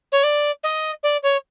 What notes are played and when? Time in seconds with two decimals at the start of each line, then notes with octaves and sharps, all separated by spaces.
0.12 C#5
0.23 D5
0.63 D#5
1.03 D5
1.23 C#5